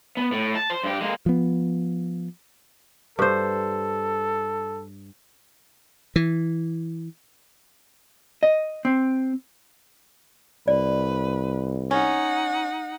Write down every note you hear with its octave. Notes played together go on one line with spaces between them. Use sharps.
B3
A2
A5
C5
G2 G4
G#3 A#3
F3 B3
G2 A4 C5
E3
D#5
C4
C2 B4 D5
C#4 D#4 F#5